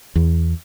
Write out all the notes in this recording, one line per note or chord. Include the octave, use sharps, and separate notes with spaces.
E2